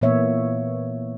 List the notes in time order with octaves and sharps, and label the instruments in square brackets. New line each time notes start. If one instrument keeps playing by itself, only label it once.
[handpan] A#2 E3 A#3 B3 C#5 E5